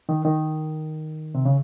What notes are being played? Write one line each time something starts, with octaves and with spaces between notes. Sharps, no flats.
D#3
D#3
C3
C#3